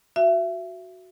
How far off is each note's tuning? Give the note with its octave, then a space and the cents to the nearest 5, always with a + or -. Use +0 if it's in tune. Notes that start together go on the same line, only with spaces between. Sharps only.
F#4 +0 E5 +30